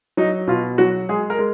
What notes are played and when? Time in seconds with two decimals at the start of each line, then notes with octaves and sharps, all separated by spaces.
0.17 F#3 D#4
0.47 B2 F4
0.78 F#3 F#4
1.09 G#3 G#4
1.30 A#4
1.39 G#3